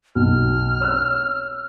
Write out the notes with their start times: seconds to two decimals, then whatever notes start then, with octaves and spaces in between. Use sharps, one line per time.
0.15 B1 F6
0.81 C#5 E6 F#6